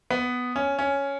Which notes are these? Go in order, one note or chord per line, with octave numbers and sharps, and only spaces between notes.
B3
C#4
C#4